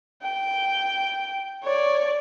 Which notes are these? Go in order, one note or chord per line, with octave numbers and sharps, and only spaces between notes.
G5
C#5 D5